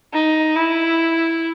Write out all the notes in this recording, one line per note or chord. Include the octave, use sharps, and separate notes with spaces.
D#4
E4